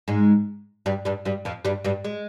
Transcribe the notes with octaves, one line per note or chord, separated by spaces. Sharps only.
G#2 G#3
G2 G3
G2 G3
G2 G3
F2 F3
G2 G3
G2 G3
G#3